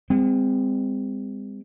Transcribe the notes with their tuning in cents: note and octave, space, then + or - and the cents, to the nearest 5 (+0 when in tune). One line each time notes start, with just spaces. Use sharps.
G#3 -45 C4 -25